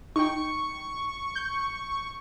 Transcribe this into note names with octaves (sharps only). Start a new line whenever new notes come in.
D#4 G5 C#6
G6